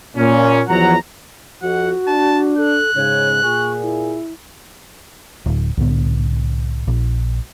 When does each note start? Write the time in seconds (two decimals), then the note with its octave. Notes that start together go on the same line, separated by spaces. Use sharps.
0.16 A#2 C#4
0.68 E2 F3 F#3 F#4 F#5 A#5
1.62 F2 F#4 F#5
2.07 D4 A5
2.58 A4 F#6
2.95 G#2 C#3 C#5
3.43 A#2 G#4 C#6
3.82 E4
5.46 D1
5.77 C2 A2 D3 B3
6.87 A#1